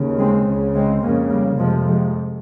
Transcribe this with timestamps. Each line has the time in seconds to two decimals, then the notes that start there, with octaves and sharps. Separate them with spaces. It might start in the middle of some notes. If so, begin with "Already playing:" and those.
Already playing: D#2 C#3
0.18 G#3 C4
0.46 C#2 C#3
0.75 G#3 C4
1.02 C#3 A#3 C#4
1.07 F2
1.30 G3 A#3
1.58 F2 C3 F3 G#3
1.87 F3 G#3